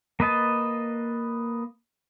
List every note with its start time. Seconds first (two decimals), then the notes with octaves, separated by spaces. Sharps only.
0.20 A#3 B4 D#5 A5